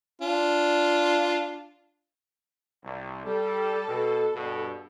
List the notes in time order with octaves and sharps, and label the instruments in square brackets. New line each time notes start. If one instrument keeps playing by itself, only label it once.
[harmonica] D4 F4
[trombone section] C2
[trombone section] G3 [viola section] A4
[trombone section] B2
G2 B2